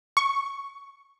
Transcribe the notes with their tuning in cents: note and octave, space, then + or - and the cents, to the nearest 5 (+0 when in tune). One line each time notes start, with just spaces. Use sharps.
C#6 +5